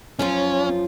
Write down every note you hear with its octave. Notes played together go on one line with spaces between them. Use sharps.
F#2 F3 C#4 F4